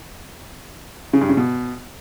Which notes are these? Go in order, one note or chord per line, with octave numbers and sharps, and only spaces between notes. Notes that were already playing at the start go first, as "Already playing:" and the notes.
C#3
G2
C#3
B2